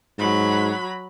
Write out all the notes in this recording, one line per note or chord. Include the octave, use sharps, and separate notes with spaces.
G#2 F#3 B5